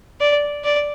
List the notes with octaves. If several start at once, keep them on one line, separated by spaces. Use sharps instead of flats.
D5
D5